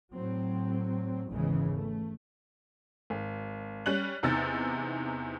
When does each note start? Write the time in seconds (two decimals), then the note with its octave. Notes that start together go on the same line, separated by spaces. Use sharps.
0.14 A2 F#3 C4
1.29 G#1 E2 G#2 C#3 E3 G#3
1.76 A3
3.10 G#1
3.86 G3 C#4 F#6 F#7
4.23 E2 C3 D#4 E6 A6